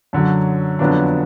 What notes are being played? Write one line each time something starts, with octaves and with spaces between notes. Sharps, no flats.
F#2 D3 F#3
F2 D3 F#3 B3 D4